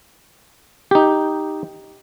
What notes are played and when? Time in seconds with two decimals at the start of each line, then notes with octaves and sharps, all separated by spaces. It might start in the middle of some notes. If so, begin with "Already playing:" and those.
0.91 D#4 G4